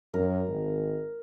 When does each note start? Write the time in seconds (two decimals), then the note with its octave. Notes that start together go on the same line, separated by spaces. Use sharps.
0.14 F#2 A#4
0.48 G#1